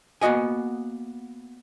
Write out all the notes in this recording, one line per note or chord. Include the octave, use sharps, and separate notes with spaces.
A#3 B3 F#4 D#5 G#5